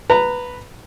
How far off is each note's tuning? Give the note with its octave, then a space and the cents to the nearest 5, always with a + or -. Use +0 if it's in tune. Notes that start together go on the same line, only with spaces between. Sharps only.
B4 +0 A#5 -20